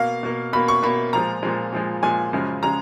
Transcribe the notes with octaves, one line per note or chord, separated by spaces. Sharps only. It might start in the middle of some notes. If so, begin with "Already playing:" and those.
Already playing: B2 A#3 F5
B2 A#3
B2 A#3 B5
C#6
B2 A#3 B5
A#2 F3 G#3 A#5
A#2 F3 G#3
A#2 F3 G#3
A#2 F3 G#3 G#5
F#2 C#3 F3 G#3
C#3 F3 G#3 A#5